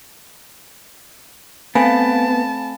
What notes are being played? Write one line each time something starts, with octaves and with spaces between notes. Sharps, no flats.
A3 B3 C4 F5 G#5 A5 B5